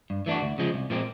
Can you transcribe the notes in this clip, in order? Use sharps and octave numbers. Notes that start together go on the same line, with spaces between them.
G2
E3 A3 D4 F#4
D2
C#3 F3 G#3
C2
A#2 F3 G#3 C4